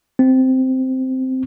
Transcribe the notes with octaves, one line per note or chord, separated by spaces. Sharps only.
C4